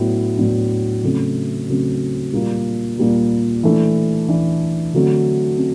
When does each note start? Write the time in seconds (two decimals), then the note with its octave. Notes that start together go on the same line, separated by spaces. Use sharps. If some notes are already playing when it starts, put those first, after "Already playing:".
Already playing: A2 F#3 B3 D4
0.37 A2 F#3 B3 D4
1.03 C#3 F#3 A3 C4
1.68 C#3 F#3 A3 C4
2.33 A#2 G3 A#3
2.98 A#2 G3 A#3
3.63 E3 A3 D4
4.28 E3 A3 D4
4.94 D3 F#3 A3 C4
5.58 C4